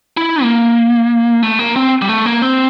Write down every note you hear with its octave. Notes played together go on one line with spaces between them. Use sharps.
E4
A#3
A3
A#3
C4
G3
A3
A#3
C4